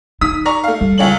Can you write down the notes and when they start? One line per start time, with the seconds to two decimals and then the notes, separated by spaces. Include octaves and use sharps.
0.21 D#4 D#6 B6
0.45 D5 A#5 C#6
0.64 A3 F5
0.81 G3
0.98 C#2 C#5 F#7